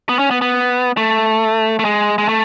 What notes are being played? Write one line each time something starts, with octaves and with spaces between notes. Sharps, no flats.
B3
C#4
B3
B3
A3
A3
G#3
G#3
A3